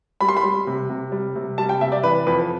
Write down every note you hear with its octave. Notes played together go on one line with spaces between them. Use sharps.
G3 B5
C6
B5
G3
C3
C3
G3
C3
G3 A5
G5
C3 E5
D5
E3 B4
F2 B4